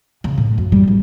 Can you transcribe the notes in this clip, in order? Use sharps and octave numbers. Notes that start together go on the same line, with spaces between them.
C#3
A2
F#2
G3
G#1